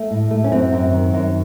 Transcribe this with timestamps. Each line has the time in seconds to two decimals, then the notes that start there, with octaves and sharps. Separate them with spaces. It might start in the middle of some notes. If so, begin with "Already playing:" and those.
Already playing: A3
0.11 A2
0.31 A3
0.44 C#4
0.52 F#2 C4
0.73 F#2
0.93 D#3
1.13 F#2